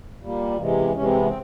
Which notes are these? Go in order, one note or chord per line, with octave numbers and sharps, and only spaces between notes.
A#2 G3 A#3
C3 E3 G#3 A#3
A#3
B3
C3 E3 G#3 C#4
C4
B3
C4